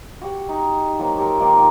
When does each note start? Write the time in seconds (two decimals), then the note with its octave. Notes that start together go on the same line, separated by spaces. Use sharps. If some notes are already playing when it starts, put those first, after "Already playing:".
0.22 F#4 G4 F#5
0.49 D#4
0.99 F3 F#3 A#3 F4
1.18 G4 A4 A#4
1.40 D#3 A#3 C5 D5
1.57 F3 D#4 D5